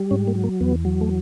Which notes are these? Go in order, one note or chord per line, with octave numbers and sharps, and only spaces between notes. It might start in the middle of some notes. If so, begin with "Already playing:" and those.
Already playing: G3
G#2 C#4
A#3
F#3
A#3
E2 B3
F#3
A3